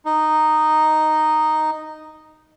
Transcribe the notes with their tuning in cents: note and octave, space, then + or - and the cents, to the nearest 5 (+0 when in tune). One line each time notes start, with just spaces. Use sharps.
D#4 -5